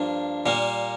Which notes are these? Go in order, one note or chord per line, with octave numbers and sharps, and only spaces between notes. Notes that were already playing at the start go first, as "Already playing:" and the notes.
Already playing: G2 F3 A#3 D4
A#2 G3 A#3